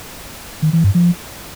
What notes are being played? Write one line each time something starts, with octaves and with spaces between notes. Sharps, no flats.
D#3
E3
G2
F3